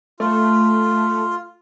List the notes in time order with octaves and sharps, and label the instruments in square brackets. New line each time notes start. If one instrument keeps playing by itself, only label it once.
[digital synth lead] A3 [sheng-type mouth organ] F4